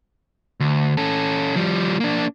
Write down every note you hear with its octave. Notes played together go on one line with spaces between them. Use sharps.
D2
C#4 A4
F3 G3
A#3 D4